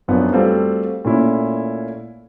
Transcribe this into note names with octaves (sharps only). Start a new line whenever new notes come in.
F#2 F3 B3 D4
G3 A3 C4 F4 F#4 A4
A#2 A3 C#4 E4